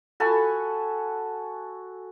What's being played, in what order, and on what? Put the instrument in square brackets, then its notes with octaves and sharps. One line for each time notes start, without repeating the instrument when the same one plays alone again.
[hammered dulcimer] F#4 A4 G#5 B5